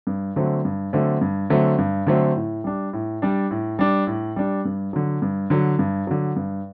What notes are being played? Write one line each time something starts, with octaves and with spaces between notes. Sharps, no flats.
G2
D3 F#3 A3 C4
G2
D3 F#3 A3 C4
G2
D3 F#3 A3 C4
G2
D3 F#3 A3 C4
A2
G3 D4
A2
G3 D4
A2
G3 D4
A2
G3 D4
G2
D3 F#3
G2
D3 F#3
G2
D3 F#3
G2